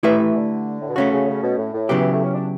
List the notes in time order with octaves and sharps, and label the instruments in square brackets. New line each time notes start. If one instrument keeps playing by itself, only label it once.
[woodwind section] E3 [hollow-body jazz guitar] A3 E4 G4 B4 E5
[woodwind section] E3
D3
A2
B2
[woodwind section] C#3 [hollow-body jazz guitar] A3 C#4 F#4
[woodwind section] C#3
C#3
B2
A2
A2
[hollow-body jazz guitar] C#3 F#3 B3 E4 G4
[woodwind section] E3
A3
C#4
D4